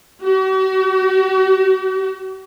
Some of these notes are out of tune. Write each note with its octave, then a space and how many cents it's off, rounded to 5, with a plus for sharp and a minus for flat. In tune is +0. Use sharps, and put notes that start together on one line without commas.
F#4 +45